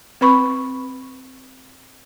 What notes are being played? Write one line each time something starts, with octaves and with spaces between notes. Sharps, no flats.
C4 B4 B5 C#6